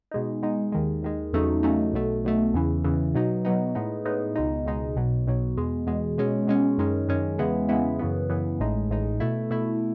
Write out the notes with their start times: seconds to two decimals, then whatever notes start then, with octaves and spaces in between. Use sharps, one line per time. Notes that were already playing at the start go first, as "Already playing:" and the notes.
0.11 B2 G#3 D#4
0.43 B2 G#3 D#4
0.72 D#2 D#3 G#3
1.03 D#2 D#3 G#3
1.33 E2 C#3 F#3 A3 D#4
1.63 E2 C#3 F#3 A3 D#4
1.93 B1 B2 A3
2.24 B1 B2 A3
2.54 E2 C#3 E3
2.84 E2 C#3 E3
3.15 B2 F#3 B3 D#4
3.45 B2 F#3 B3 D#4
3.75 A2 G#3 B3 D#4
4.05 A2 G#3 B3 D#4
4.35 C#2 B2 G#3 D#4
4.65 C#2 B2 G#3 D#4
4.96 B1 B2 F#3
5.27 B1 B2 F#3
5.57 E2 B2 G#3
5.87 E2 B2 G#3
6.18 B2 G#3 C#4
6.47 B2 G#3 C#4
6.78 F#2 D#3 G#3 C#4
7.08 F#2 D#3 G#3 C#4
7.38 E2 C#3 G#3 B3 E4
7.69 E2 C#3 G#3 B3 E4
7.99 F#2 C#3 E3 B3
8.30 F#2 C#3 E3 B3
8.60 A1 A2 G#3 D#4
8.90 A1 A2 G#3 D#4
9.20 B2 A3 E4
9.50 B2 A3 E4